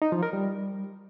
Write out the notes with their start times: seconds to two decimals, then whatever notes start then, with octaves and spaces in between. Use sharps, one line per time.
0.02 D#4
0.12 F3
0.23 A#4
0.33 G3